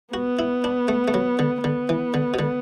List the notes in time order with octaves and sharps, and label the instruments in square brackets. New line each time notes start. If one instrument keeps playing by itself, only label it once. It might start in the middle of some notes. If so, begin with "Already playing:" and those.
[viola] B3 [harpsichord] F#4
[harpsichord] E4
D4
A3
A3
F#3
D3
[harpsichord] D3 [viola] B3
[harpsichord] E3
D3
B2
D3